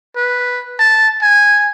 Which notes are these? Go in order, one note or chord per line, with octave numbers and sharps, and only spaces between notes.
B4
A5
G#5